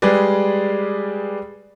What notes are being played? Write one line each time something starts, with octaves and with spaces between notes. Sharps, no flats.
G3 G#3 G#4 B4 D5